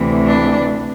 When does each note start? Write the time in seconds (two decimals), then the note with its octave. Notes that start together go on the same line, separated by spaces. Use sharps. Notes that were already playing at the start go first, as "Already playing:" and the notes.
Already playing: D2 C3 E3
0.27 D4